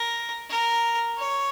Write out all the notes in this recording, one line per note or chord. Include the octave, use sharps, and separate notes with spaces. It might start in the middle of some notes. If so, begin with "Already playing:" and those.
Already playing: A#4
A#4
C#5